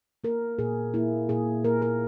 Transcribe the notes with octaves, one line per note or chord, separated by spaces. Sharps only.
A#3 A#4
A#2 G#4
A#3 E4
A#2 G#4
A#3 A#4
A#4